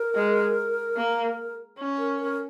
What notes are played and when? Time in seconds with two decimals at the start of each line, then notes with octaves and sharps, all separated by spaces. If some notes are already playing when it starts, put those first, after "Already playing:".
Already playing: A#4
0.15 G#3
0.96 A#3
1.79 C#4
1.98 A#4
2.19 A#4